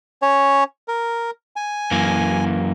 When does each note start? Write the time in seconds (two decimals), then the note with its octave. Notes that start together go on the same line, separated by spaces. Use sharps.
0.22 C#4 C#5
0.88 A#4
1.56 G#5
1.91 F#2 E3 A#3